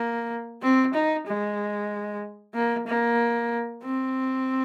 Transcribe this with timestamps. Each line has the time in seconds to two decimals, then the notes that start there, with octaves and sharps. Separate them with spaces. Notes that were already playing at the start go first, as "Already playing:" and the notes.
Already playing: A#3
0.62 C4
0.94 D#4
1.27 G#3
2.55 A#3
2.87 A#3
3.83 C4